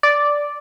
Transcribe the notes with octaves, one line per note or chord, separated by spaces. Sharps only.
D5